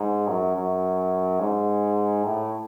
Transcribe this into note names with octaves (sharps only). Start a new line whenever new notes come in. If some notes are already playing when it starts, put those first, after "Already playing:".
Already playing: G#2
F#2
F#2
G#2
A2